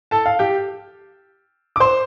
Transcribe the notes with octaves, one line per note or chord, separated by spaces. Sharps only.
A4 A5
F5
G4 G5
D6
C5 C6